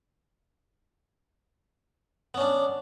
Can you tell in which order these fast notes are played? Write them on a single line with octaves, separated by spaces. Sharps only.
B3 C#4 D4